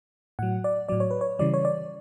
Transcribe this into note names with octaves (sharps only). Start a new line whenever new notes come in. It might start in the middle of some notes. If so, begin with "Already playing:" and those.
A2 F#3 F#5
D5
A2 F#3 D5
C#5
B4
C#5
C#3 E3 G3 D5
C#5
D5